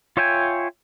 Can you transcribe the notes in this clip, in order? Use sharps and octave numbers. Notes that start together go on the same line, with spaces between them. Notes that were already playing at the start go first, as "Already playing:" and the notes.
F4 C#5 E5 G5 G#5